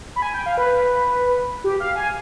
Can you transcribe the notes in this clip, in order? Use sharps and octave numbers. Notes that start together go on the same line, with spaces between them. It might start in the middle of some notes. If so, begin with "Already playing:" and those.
B5
G#5
G5
F5
B4
G4
F5
G#5